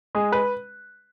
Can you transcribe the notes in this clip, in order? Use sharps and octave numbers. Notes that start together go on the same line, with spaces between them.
G#3 G#4
B4